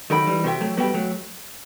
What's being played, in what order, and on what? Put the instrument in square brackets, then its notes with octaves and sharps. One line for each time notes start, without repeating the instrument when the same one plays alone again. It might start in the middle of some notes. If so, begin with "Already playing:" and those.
[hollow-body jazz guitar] D#3 F#3 [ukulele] A4 D#5 G5 B5
[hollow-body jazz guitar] E3 G3
[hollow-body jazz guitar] C3 [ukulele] F#4 A4 E5 G5
[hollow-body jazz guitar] F#3 A3
[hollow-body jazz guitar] G3 B3 [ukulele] F#4 A4 E5 G5
[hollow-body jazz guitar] F#3 A3